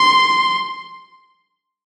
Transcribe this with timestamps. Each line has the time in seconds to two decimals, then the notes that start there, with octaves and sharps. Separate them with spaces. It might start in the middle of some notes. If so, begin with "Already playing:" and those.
Already playing: C6